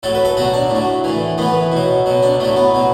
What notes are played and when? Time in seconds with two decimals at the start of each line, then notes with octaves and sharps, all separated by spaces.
0.03 A2 F#3 A4
0.15 B4
0.25 A4
0.37 B2 F#3 F#4
0.53 D4
0.70 A2 F#3
1.04 A2 E3
1.38 A2 E3 B3
1.72 B2 F#3
2.06 B2 F#3
2.23 D4
2.39 A2 F#3 A3
2.56 B3
2.74 B2 F#3